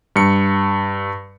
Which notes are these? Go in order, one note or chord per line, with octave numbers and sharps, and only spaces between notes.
G2 C#7